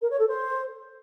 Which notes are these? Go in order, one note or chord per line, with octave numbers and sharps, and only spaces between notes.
A#4
C#5
A4
C5